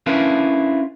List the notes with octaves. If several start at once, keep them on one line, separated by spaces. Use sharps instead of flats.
C#4 D4 E4 F4 A#4 B4